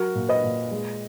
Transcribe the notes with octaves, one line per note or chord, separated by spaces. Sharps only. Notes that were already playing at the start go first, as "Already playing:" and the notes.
Already playing: F#3 F#4 A#4
A#2
B4 D#5
A#2
G#3